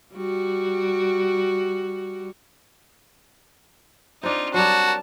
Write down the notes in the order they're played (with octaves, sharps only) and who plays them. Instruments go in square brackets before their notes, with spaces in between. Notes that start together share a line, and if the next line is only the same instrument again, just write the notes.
[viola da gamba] G3 F#4
[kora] C4 D4 [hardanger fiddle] D#4 F4
[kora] F#3 G3 [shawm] F#4 [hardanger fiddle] A#4 A5